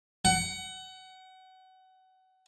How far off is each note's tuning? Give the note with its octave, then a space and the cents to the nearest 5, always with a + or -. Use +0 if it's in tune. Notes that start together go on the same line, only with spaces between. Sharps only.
F#5 +25